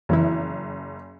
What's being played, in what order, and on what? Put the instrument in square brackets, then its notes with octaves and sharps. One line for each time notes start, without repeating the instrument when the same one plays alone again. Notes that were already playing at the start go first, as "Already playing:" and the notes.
[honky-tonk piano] F#1 [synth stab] F2 E3 E4